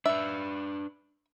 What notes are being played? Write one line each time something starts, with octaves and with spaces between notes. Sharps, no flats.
D4 B4 E5